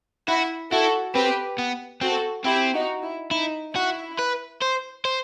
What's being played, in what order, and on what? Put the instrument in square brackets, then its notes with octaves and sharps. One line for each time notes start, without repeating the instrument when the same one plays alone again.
[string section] E4 [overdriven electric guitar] F#4
[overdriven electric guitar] E4 [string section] F#4 A4
[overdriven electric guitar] C4 [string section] G4 B4
[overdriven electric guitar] B3
[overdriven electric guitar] C4 [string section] F#4 A4
[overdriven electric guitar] C4 [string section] E4 G4
[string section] D#4 F#4
E4
[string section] D#4 [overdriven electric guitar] E4
[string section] E4 [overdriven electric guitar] F#4
[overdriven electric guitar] B4
C5
C5